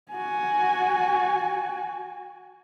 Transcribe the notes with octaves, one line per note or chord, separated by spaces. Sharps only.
F#4 G#5